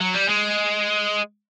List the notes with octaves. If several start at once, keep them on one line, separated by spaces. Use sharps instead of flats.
F#3
G3
G#3